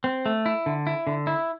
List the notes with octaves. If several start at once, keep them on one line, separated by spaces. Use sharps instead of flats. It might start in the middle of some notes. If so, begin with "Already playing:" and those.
C4
A3
E4
D3
E4
D3
E4